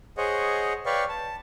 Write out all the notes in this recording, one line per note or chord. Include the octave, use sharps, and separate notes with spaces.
G#4 C5 C#5 D#5 F#5
B4 C#5 D5 F5 G5 C#6
A5